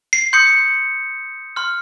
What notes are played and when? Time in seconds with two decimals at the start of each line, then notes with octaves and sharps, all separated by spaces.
0.13 C7
0.33 C6 D#6 G6 C#7
1.56 C6 F6